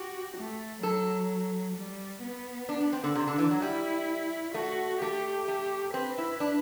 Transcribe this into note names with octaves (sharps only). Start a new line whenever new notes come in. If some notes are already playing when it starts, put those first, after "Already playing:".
Already playing: F#4 G4
A3
F#3 A4
G3
B3
D4
D4
C4
D3
C3 D4
D3
E3
F#3
G3 E4
A3 F#4
A3 G4
A3
C4 B4
E4
D4